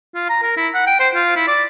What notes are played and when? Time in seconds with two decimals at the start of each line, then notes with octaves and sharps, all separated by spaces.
0.15 F4
0.29 A#5
0.43 A#4
0.57 E4
0.74 F#5
0.87 G5
1.00 C5
1.15 F4
1.36 E4
1.48 D5